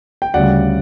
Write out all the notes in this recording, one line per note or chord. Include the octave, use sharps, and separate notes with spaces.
G5
D2 C#3 G3 D5 F#5